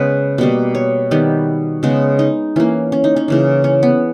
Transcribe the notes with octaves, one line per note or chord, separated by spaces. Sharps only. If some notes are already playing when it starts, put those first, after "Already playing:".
Already playing: C#3 G#3 B3 G#4 B4
B2 G3 A#3
C#5
D#3 G3 B3
C#3 G#3 B3
D#4
E3 A#3 C#4
C#4
D#4
C#4
C#3 E3 A#3
C#4
B3